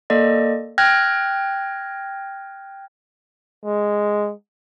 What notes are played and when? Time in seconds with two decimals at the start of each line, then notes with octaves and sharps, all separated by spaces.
0.10 A#3 A4 D5 D#5
0.78 G5 F6 F#6 G#6 A#6
3.65 G#3